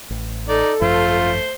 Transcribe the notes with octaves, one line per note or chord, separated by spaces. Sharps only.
A1
D#4 A4 D5
G#1 F#2 F3 A3 F4 C5